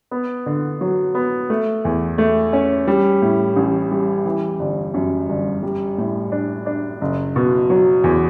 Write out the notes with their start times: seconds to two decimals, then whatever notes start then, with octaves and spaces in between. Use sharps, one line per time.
0.11 B3
0.46 D3
0.81 F#3
1.15 B3
1.50 A3
1.85 E2
2.18 A3
2.53 C#4
2.87 G3
3.22 A2
3.56 A1
3.91 G3
4.25 E3
4.59 G1
4.94 F#2
5.29 G1
5.63 G3
5.98 A2
6.32 D4
6.66 D4
7.01 F#1
7.36 B2
7.70 F#3
8.04 E2